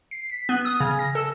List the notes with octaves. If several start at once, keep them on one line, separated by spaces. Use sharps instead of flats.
C7
B6
B3
D#6
C#3
A#6
A4